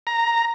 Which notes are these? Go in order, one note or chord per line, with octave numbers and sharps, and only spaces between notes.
A#5